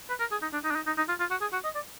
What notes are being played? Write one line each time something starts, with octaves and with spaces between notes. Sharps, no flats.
B4
A#4
G#4
D#4
D4
D#4
D4
D#4
D#4
D#4
F4
F4
F#4
G#4
F#4
D#5
D5